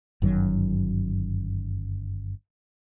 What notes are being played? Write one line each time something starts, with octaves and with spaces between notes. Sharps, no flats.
G1 F#2 D#3 F#3